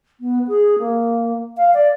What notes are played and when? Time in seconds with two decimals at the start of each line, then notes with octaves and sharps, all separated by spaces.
0.20 B3
0.48 G#4
0.79 A#3
1.57 F5
1.74 D5